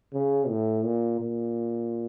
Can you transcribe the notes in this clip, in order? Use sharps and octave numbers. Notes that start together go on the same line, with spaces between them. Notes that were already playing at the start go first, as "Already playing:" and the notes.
C#3
A2
A#2
A#2